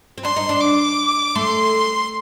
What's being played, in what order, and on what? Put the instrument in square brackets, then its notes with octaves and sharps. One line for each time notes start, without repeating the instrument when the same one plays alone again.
[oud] C4
[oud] D4 [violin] C6
[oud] D#4
D4
[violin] D6
[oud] A3 [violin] C6